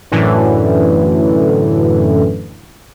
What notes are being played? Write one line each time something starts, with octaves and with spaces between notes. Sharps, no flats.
F#2 A2 D3 E3